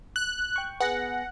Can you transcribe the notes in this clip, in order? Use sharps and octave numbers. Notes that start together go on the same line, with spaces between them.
F#6
G5 C#6
B3 G#4 F#5 A#6